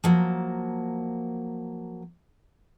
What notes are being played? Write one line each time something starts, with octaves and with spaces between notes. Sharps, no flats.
F3 F#3 A#3